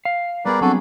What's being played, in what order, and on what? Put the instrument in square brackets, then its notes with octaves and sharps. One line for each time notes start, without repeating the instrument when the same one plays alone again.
[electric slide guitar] F5
[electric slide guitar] G3 B3 G#4 [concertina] A#4 B4 D5
[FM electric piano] F#3 C4 D4 [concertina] F#4 A4